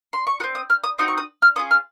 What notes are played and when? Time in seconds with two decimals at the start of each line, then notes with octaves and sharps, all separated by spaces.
0.13 C6
0.27 C#6
0.40 F#4 D#6
0.44 C4
0.55 D#6
0.70 F6
0.84 D#6
0.98 C4 D#4 F#4 D#6
1.08 C#6
1.18 D#6
1.42 F6
1.56 C#4 F4 G#4 D#6
1.71 F6